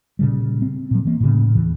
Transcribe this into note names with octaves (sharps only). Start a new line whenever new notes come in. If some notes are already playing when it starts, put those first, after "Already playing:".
A#2 C#3 G3
C4
A#2 F#3
E3 A#3
A2 C#3
D#2 E3